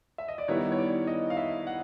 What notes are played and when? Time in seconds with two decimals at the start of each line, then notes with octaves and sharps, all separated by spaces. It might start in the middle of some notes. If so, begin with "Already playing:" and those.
0.18 E5
0.28 D#5
0.38 D5
0.48 D#3 G3 B3 E4 C#5
0.72 C#5
0.78 D5
1.07 D#5
1.30 F5
1.37 E5
1.67 F#5